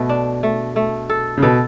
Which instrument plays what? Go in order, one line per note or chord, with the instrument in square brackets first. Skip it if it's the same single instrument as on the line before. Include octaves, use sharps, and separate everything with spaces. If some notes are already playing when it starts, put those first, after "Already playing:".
Already playing: [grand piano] B2 [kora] A3
[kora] D4
A3
A3
A4
[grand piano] C#3
[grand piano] B2 [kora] A4